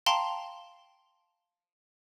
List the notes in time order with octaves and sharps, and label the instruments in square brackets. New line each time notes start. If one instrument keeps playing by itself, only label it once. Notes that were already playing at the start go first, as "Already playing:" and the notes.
[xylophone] F5 G5 A5 A#5 C6